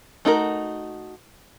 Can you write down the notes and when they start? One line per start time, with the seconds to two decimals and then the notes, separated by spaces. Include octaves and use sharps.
0.25 A3 D#4 F#4 G#4 A#4